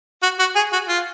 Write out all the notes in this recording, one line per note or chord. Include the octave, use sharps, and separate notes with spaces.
F#4
F#4
G#4
F#4
F4